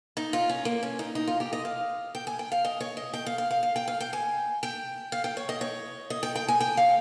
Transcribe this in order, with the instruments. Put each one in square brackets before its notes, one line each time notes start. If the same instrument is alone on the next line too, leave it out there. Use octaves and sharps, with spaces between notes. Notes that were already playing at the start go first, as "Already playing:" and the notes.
[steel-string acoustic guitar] D#4
F4
C#4
A#3
C#4
D#4
D#4
F4
G4
D#5
F5
G5
G#5
G5
F5
D#5
C#5
D#5
G5
F5
F5
F5
F5
G5
F5
G5
G#5
G5
F5
G5
C#5
D#5
C#5
D#5
G5
G5
G#5
G5
F5